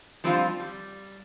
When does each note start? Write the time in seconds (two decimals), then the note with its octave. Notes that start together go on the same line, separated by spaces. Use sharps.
0.24 F3 G3 C4 D4 E4 F4
0.60 G3